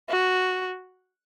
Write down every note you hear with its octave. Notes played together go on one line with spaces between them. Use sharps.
F#4